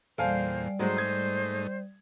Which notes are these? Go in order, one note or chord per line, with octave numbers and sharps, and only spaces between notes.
E2 A#2 G3 A4 C5 D5 F5 G#5
G#2 F#3 G#3 A3 D#4 C5
D#6 G#6